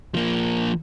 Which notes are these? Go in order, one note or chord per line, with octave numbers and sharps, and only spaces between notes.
F3 A#3